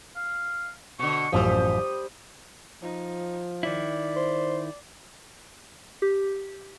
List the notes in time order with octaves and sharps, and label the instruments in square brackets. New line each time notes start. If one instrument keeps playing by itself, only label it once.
[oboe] F5
[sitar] B2 D3 [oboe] C#6
[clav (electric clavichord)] A1 F#2 F3 [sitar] G3 C5 [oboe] D#6
[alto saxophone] F3 [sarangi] D#4
[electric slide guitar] D#3 E4 [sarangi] D5
[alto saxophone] C5
[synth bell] G4